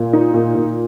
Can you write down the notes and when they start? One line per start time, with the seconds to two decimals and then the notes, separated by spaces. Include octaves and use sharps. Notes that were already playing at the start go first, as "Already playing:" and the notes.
Already playing: A#2
0.13 D#4
0.34 A#2
0.55 A#2